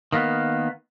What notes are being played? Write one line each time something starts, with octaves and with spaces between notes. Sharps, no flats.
D#3 A#3 B3